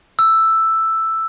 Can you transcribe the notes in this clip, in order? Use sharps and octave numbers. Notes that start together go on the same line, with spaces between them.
E6